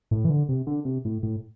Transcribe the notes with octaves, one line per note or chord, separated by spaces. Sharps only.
A2
E3
D3
C3
D3
C3
A2
A2